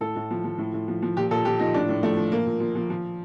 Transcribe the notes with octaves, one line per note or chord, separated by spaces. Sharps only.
A2 A4
A2
F3
F3
A2
A2
F3
F3
A#2 G4
A#2 A4
F3 G4
F3 D#4
A2 D4
A2
F3 A3
F3
A#2 A#3
A#2
F3
F3
F3